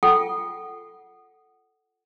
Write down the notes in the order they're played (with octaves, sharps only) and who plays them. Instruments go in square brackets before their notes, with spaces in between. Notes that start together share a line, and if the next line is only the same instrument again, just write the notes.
[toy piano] F4 A4 F#5 G5